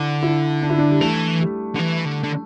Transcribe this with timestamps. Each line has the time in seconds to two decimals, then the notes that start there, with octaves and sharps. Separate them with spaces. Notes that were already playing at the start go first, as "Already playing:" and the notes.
Already playing: D3 D4 E4
0.23 E4
0.62 D4
0.70 E4
0.78 D4
0.90 G3
1.01 E3 A3
1.41 G3
1.75 D3
1.79 E3
2.05 D3
2.24 D3